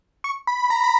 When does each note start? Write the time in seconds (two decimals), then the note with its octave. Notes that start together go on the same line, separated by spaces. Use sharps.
0.24 C#6
0.47 B5
0.59 B5
0.70 A#5
0.84 B5